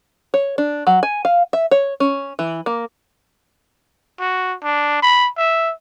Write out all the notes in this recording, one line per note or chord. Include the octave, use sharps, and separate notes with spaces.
C#5
D4
F#3
G#5
F5
E5
C#5
C#4
E3
A#3
F#4
D4
B5
E5